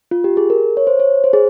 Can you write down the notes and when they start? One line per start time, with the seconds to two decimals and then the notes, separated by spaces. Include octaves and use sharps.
0.11 F4
0.24 G4
0.37 G#4
0.50 A#4
0.77 C#5
0.87 C5
1.00 C#5
1.24 C5
1.33 G#4